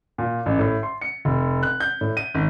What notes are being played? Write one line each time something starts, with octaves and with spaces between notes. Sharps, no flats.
A#2
A1
A2
C6
C#7
F1
F#6
G6
A2
D#7
G#1